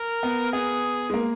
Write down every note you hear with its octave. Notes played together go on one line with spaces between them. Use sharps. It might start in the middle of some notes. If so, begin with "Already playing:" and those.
Already playing: A#4
B3
B3 G#4
G#3
A#3